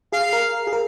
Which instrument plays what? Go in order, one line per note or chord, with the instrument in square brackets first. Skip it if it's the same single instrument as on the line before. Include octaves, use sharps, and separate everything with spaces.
[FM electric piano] G#4 [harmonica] F5
[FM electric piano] A#4
G#4
A#4